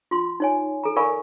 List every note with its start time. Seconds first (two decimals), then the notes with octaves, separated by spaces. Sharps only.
0.11 F4 C6
0.40 D#4 C#5 G#5
0.84 A4 A#5
0.96 A#4 D5 F5 G#5 B5 C#6